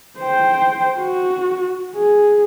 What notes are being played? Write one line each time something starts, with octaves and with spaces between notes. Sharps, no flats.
C5 G5
F#4
G#4